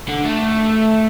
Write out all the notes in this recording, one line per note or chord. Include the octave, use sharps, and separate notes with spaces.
D3
A3